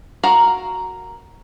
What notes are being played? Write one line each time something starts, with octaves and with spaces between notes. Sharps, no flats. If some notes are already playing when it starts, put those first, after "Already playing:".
F#4 A#4 F5 F#5 A#5